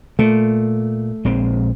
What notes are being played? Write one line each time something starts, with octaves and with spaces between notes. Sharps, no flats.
A#2 A3
A#1 G#3 C4